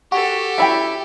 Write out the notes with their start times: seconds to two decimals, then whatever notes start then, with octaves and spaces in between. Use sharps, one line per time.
0.12 F#4 G4 A4
0.58 C#4 E4 E5 G5